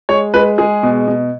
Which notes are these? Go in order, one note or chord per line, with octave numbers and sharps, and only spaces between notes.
G#3 C#5
G#3 B4
G#3 G#4
B2
B2